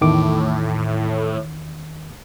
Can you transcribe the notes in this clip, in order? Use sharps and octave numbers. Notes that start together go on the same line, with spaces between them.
E2 A2 D#3 D6